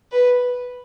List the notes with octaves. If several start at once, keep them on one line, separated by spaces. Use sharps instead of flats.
B4